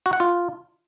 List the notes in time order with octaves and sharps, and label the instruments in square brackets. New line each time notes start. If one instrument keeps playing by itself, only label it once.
[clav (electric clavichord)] F#4
F#5
F4